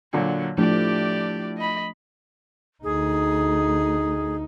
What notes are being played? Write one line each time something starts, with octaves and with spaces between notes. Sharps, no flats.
A#2 D3 F#3
A2 F3 A3 D4 G4 D5
D#5 B5
D2 D#4 G#4